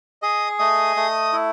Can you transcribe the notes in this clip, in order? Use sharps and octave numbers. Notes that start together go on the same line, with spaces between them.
G#4 D#5 D#6
A3 D#5 D#6
A3
E4